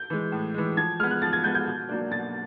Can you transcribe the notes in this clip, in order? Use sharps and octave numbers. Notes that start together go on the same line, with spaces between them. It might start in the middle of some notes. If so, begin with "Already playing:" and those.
Already playing: G6
E3 G#3
A2
E3 G#3
F3 G#6
G#3 B3 F6
F#6
F3 A6
G#6
G#3 B3 G6
G6
B2
F#3 A#3 D4
B2 A6